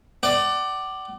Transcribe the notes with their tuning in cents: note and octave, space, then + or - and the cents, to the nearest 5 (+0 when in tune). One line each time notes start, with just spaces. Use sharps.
D5 +10 F#5 +40